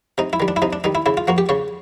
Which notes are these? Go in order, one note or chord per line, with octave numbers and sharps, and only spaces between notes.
C3 D#4
E4
D#3 G3
D4
E4
C3 D#4
D4
D#3 G3 D#4
E4
C#3 E4
F4
F3 A#3 F#4
G4
C#3 C#5